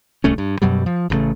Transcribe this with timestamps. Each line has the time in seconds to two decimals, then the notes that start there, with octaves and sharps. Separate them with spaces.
0.24 D1 C2 A3 C#4
0.38 G2
0.62 F#2 B2 F#3 G3
0.86 F3
1.10 A1 G2 C#3 A3